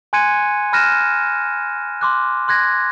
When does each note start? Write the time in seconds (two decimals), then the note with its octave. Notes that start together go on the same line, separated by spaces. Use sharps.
0.13 G#5 C6 F#6 G#6 C#7 D#7
0.73 B5 F6 F#6 A#6 D#7 E7
2.01 C6 D6 F#6
2.48 C6 F#6 G#6 A#6